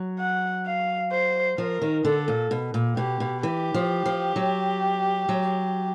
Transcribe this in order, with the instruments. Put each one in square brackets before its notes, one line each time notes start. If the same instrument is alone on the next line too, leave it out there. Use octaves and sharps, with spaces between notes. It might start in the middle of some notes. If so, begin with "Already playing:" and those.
Already playing: [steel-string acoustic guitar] F#3
[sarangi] F#5
F5
C5
[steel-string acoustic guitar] F3 [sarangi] A#4
[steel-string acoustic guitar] D#3
[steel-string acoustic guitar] D3 [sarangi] A4
[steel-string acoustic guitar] A#2
B2
A#2
[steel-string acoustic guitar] B2 [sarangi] G4
[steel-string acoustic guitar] B2
[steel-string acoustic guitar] E3 [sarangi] G4
[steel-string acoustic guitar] F3
F3
F#3
F#3